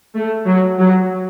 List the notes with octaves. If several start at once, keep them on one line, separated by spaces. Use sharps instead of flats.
A3
F#3
F#3